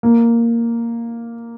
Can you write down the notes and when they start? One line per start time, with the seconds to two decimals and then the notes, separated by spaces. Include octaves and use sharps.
0.03 A#3